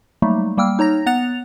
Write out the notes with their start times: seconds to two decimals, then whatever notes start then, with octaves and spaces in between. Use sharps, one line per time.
0.22 F#3 G3 A3 A#3 D#4
0.57 G3 A#3 G5 E6 F6
0.79 D#4 C#5 A#5 A#6
1.06 B3 F#5 F#6 A6 F7